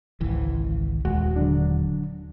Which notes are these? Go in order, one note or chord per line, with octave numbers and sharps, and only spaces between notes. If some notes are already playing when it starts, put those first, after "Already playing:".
G#1 C#2 E3
D#1 G#3 F#4
D3 F#3 D4